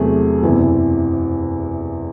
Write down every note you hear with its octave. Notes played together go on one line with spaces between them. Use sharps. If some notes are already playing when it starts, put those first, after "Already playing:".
Already playing: E2 C3 F#3 A3 G#4
F#1 E2 C3 E3